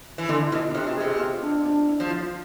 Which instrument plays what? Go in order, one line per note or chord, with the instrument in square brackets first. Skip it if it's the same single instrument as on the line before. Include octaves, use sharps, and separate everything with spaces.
[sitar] E3
[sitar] D3 [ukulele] E4
[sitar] B2 [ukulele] F4
[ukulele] E4
[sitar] C3 [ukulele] F4
[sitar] B2
[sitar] C3 [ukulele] G#4
[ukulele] F4
D4
D4
E4
[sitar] F3
[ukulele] F4